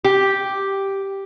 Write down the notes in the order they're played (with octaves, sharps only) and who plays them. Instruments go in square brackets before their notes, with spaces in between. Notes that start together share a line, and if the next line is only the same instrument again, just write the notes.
[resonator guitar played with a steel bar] G4